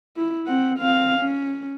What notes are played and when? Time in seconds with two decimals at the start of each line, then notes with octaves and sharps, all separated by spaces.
0.17 E4
0.47 C4 F#5
0.79 C4 F5
1.19 C#4